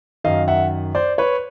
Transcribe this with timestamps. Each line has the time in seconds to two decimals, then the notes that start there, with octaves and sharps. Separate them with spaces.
0.24 F#2 D#3 D#5 F5
0.48 E5 F#5
0.95 C5 D5
1.18 B4 C#5